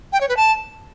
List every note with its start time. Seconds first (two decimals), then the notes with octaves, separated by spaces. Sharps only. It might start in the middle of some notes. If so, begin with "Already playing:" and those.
0.13 G5
0.21 C#5
0.29 B4
0.37 A5